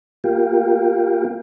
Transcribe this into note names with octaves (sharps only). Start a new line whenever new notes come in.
A#3 F4 G4